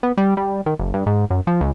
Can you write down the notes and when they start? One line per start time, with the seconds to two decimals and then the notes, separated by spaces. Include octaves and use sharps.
0.03 B3
0.18 G3
0.37 G3
0.66 D#3
0.79 F#1
0.94 G2
1.06 G#2
1.30 F#2
1.47 F3
1.61 C#2